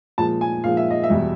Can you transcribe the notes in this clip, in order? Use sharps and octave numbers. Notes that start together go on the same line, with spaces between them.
A#2 F3 G#3 A5
G#5
A#2 F3 G#3 F5
E5
D#5
E5
E2 B2 G3